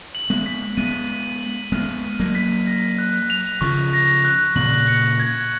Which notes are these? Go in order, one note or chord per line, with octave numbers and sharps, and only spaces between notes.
F#7
G#3 B3
B6
G#3 B3 D#7
B6
F#7
G#3 B3 F6
D#7
F#3 A#3
B6
A#6
F#6
F7
C#3 F3 C#6
A#6
F#6
A#2 C#3 F#7
C#7
G#6